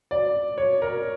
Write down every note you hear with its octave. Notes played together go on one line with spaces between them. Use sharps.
D5
C#5
A#4